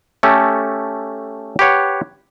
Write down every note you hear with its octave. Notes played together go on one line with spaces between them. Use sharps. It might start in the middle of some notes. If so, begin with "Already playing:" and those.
A3 C#4 G4 A4
G4 B4 C#5 F#5